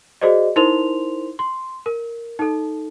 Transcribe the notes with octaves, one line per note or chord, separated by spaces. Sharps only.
F#4 G#4 C5 D5 D#5
D#4 E4 A#4 C5 C6 F7
C6
A#4
D#4 A4